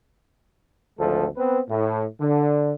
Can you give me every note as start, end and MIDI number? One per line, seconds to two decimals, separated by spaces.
0.99 1.27 32
0.99 1.27 38
0.99 1.27 53
0.99 1.27 56
0.99 1.27 69
1.37 1.59 59
1.37 1.59 60
1.37 1.59 71
1.69 2.04 45
2.20 2.73 50